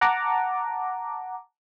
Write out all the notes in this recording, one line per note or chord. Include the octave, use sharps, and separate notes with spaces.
F#5 A5 A#5 D6